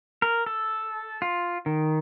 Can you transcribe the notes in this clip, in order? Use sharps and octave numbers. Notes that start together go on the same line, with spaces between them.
A#4
A4
F4
D#3